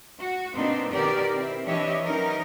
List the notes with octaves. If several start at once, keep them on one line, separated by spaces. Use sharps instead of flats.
F#4
B2 A#3 C4 D4 D#4
B2 D#3 C#4 G4 A#4 D5
C4 E4
E3 D4 E4 G4 C#5 D#5
E3 F#3 C#4 D#4 A#4